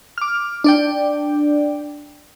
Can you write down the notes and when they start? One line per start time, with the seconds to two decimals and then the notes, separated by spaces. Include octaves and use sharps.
0.18 D6 F6
0.64 D4 D5 G5